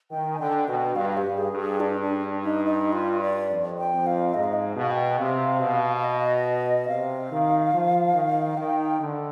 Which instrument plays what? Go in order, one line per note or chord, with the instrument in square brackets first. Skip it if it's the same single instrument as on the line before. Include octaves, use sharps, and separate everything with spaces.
[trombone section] D#3 [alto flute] G5
[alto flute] G#5
[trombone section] D3 [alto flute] G5
[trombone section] B2 [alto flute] G5
[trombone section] G2 [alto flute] F5
[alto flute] G4
[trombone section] G2
[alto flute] G#4
[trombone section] G2
[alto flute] G#4
D4
D4
D#4
D#4
F4
D5
[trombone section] F2
[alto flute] G5
[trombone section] F2
[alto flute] F5
[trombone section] G#2 [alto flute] D#5
[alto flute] F5
D#5
F5
[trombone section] B2
[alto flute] F5
G5
[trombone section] C3 [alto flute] F5
[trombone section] B2
[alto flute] F5
D#5
[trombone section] C3 [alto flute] F5
[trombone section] D#3
F3
D#3
[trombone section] D#3 [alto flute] G5
[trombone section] D3